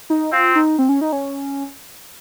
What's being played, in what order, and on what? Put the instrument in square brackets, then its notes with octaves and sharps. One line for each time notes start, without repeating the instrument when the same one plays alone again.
[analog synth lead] D#4
[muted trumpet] C4 [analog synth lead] F4
[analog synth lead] D#4
C4
C#4
D#4
C#4